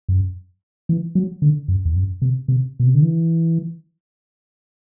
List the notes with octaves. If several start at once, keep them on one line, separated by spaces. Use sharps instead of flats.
F#2
E3
F#3
D3
F#2
E2
F#2
C3
C3
B2
C3
D3
E3